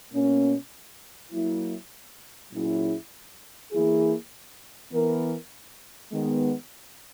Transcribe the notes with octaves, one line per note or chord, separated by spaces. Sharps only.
B2 A#3 C#4
F#3 A#3 E4
A#2 F#3 C#4 E4 G#4
E3 A#3 E4 G#4
E3 B3 E4 A#4
D#3 G#3 B3